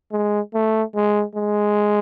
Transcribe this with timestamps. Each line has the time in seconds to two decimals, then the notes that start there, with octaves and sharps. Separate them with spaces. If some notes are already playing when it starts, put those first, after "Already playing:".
0.12 G#3
0.54 A3
0.95 G#3
1.35 G#3